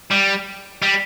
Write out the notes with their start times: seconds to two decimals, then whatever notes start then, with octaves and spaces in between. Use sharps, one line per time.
0.11 G3
0.82 G3